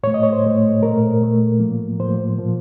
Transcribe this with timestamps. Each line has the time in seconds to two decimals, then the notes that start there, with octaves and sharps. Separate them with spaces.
0.03 A2 C#5
0.07 A3
0.14 D#5
0.23 C#5
0.33 C5
0.44 A2 A3
0.82 A#2 A3 A#4
1.21 A#2 A3
1.60 A2 F3 A#3
1.99 A2 F3 A#3 C5
2.39 A#2 F3 A#3